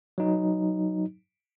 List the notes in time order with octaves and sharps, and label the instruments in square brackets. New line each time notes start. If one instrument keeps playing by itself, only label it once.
[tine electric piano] F#3 D#4